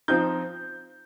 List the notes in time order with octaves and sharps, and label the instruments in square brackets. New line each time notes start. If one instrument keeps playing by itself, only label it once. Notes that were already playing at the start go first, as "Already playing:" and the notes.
[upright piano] F3 C4 D#4 G6